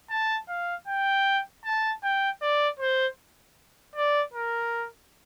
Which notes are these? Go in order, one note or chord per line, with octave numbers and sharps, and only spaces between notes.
A5
F5
G5
A5
G5
D5
C5
D5
A#4